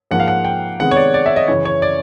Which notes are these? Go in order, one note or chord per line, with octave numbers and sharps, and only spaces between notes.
G#2 F3 A#3 F#5
F5
F#5
G5
C3 D#3 G#3 B3 F#5
C#5
D5
D5
E5
D#5
F#2 C#3 E3 C#5
C#5
D5